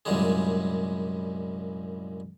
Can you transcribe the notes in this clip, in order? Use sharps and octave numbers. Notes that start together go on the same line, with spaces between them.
C2 F#2 A#2 G3 G#3 G#4